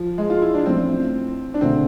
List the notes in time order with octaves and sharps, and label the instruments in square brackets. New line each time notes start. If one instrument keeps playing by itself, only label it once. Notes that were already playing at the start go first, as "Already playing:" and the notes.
Already playing: [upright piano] F3
G#3
F4
E4
D4
[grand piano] A1 A2 F3 [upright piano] C4
[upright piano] D4
[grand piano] E1 D2 D3 [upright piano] C4